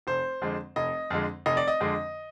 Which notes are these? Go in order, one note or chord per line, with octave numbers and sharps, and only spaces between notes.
F1 C5
F2 D3 G#3
F1 D#5
F2 D3 G#3
F1 D#5
D5
D#5
F2 D3 G#3